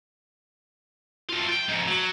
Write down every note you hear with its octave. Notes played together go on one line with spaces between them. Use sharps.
A3 F4
G5
F2 G#2
F#3